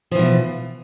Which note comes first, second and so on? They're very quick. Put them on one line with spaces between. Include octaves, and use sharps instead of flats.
F3 E3 B2